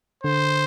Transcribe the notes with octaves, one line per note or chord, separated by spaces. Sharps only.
D3 C5